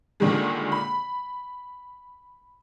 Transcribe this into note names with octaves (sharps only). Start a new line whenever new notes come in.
A#2 D3 D#3 G3 G#3
B5